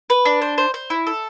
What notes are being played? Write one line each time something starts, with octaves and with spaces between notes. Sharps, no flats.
B4
D4
C5
C5
C5
E4
A4